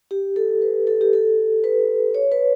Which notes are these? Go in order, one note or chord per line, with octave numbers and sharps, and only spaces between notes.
G4
A4
B4
A4
G4
A4
B4
C#5
B4